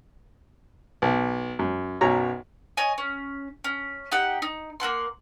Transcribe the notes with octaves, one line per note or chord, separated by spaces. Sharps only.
B1
F#2
B1 F#2 B2 C#5 A#5
C#5 D#5 G#5
C#4
C#4
D#4 G4 F#5
D#4
A#3 E4 F#5 C6